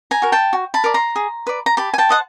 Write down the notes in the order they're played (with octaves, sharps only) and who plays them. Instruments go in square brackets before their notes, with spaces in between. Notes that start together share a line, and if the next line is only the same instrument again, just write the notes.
[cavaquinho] G#5 A#5
F#4 A#4
G5 A5
F#4
A5 B5
A#4 D5
A#5 C6
G#4
B4 D5
A#5
G4 A5 B5
G#5
G5 A5
C5 D#5 F#5